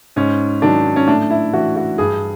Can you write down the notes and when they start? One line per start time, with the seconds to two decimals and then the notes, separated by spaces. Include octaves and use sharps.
0.16 G#2 C#4
0.62 D#3 F#3 D4
0.96 C#4
1.08 A2 D4
1.30 E4
1.53 E3 F#4
1.76 F#4
1.98 G2 G#4